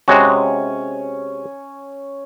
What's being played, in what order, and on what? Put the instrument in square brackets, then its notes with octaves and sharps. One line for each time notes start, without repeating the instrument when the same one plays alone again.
[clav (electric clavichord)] C3 G#3 F#4 [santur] C#4